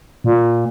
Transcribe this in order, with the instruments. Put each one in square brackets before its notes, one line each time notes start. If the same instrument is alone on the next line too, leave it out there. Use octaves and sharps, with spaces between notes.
[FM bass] A#2